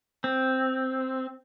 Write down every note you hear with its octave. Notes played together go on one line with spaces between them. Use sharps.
C4